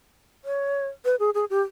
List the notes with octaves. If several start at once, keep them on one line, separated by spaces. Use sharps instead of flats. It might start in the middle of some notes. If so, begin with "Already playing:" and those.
C#5
B4
G#4
G#4
G4